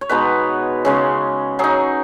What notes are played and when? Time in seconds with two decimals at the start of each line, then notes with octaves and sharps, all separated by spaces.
0.01 C#5
0.09 B2 G#3 B3 D#4 B4
0.85 C#3 G#3 C#4
1.59 F#3 D#4 G#4